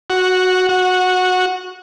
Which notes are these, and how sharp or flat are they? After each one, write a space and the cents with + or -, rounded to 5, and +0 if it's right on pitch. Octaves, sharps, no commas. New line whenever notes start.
F#4 -5
F#4 -15